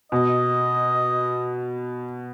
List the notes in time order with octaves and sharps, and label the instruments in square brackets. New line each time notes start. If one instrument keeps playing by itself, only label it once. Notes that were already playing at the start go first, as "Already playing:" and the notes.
[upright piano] B2 [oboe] D#5